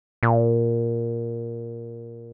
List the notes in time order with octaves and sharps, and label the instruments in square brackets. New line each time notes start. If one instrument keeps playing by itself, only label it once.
[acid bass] A#2